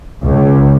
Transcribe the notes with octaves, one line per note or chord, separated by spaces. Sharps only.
C#2